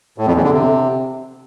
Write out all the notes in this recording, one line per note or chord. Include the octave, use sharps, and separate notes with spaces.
A2
F2
E2
D3
C3